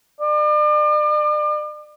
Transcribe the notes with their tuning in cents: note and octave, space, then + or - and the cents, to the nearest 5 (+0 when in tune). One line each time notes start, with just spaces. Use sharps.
D5 +40